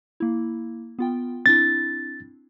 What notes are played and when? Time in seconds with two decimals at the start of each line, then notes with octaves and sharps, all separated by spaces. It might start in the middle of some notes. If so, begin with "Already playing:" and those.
0.20 A#3 E4
0.99 B3 F4 G5
1.46 C4 D4 E4 A6